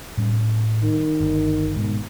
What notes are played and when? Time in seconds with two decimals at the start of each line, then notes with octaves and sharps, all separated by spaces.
0.17 A2 G3 C#4
0.83 D#3
1.20 G1
1.76 G#2 B2